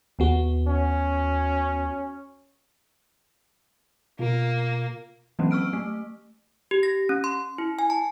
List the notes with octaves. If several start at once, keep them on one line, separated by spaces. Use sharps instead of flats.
D#2 B3 F#4
C#4
B2 A#3 F4
E3 F#3 A#3 C4 C#4
C#6 E6 F6 D7
A3
G4
A#6
C#4
C6
E4
G#5
A5